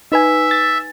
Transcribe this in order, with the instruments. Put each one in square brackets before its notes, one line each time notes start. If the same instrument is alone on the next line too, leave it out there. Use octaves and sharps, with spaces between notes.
[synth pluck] D#4 B4 G#5 [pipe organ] E5
[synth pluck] A6